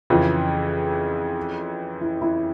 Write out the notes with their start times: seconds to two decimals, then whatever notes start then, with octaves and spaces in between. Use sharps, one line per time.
0.10 F2 C#3 E3 F4
2.01 E4
2.22 E4